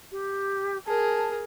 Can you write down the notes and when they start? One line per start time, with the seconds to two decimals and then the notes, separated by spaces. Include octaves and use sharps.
0.11 G4
0.86 G#4 A#4 A5